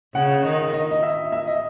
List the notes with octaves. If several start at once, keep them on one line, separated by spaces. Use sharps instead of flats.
C#3 F#5
D#3 D#5
D#5
D#5
E5
E5
D#5